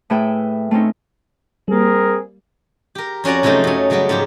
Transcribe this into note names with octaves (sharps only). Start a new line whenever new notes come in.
A2 A3 G#4 B4 E5 G5
A3 C4 C#4 D#4
G3 A#3 C4 G#4 A#4
G4 A#4
F2 C#4 F#4 D5 A#5
C3 F3 F#3 A3 D#4
F#2 C#4
C#3 F#3 G3 B3 C#4
G#2 F3 G4